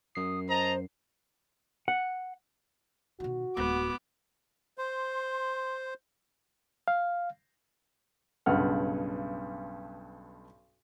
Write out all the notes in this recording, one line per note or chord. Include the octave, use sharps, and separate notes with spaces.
F#2 D#6 C7
C5 D#5 A5 A#5
F#5
B2 D#3 F#4
D1 G#3 B3 D6
C5 C6
F5
B1 G2 C#3 F#5 F6